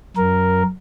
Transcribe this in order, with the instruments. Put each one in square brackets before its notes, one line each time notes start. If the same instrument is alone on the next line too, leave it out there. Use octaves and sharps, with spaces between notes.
[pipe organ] F#2 A#4